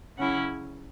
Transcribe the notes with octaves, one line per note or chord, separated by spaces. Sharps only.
C#3 F#3 C#4 E4 F#5